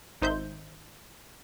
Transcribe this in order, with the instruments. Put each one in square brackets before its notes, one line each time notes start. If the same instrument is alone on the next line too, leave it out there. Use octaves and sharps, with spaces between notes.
[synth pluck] G#1 D#4 C5 E5 G6